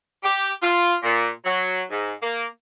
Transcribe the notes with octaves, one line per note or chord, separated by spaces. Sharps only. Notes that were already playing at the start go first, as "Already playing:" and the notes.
G4
F4
A#2
F#3
G#2
A#3